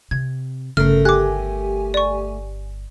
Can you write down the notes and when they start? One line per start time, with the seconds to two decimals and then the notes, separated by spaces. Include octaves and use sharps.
0.11 C3 G#6
0.77 G1 C#3 A3 A#4 F6
1.05 G4 G#5 D6 F#6
1.94 D5 C#6